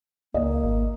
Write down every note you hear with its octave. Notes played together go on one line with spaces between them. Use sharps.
C#2 A#3 D#5
G#1